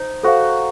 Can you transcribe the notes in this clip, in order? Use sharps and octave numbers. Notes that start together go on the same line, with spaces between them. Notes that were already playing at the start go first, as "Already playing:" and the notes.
Already playing: D#4 C5
F#4 A4 C5 F5